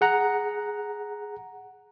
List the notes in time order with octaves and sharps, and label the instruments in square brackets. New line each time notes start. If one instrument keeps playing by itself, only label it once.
[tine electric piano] G#4 F#5 A#5